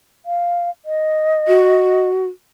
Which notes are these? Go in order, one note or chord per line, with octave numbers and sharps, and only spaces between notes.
F5
D#5
F#4